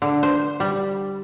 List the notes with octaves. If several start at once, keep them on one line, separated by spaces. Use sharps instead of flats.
D3
C5
G3